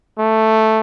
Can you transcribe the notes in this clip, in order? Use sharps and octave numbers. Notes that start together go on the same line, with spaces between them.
A3